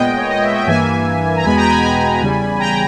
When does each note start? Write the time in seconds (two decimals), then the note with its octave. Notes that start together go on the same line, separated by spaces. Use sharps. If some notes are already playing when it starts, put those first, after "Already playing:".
Already playing: A#2 G#3 B3 D#5 G5
0.17 C#5
0.30 D#5
0.42 E5
0.55 G5
0.66 G2 E3 A#3 E5 G#5
1.36 A#5
1.44 E2 B2 G#3 B3 G#5 B5
1.57 G5 A#5
1.69 G#5 B5
1.82 G#5 B5
2.20 E2 C#3 G3
2.59 G5 A#5